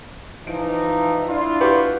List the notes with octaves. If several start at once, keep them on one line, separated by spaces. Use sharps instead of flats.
E3 F3 D#4 D7
D4 E4 F4
F#4 G4 B4